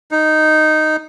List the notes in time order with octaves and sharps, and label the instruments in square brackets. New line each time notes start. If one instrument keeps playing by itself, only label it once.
[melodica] D#4